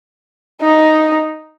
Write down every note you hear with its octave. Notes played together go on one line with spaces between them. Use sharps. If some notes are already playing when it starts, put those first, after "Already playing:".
D#4